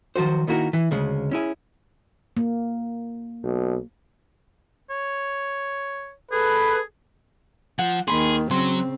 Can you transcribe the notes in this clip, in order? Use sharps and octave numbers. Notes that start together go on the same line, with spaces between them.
D#3 F3 F#3 F#4 C5
D#3 A#3 E4 F#4 A#4
E3
D2 C#3 G#3
C#4 E4 G#4
A#3
B1
C#5
G#4 A4 B4
F3 F#5
D#2 D#3 G#4 B5 C6
C#3 F#3 C4 C6